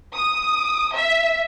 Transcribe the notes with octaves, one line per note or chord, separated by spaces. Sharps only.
D#6
E5